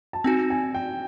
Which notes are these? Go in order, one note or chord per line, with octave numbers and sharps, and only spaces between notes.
A5
C4 D#4 F#4 G#5
G#5
G5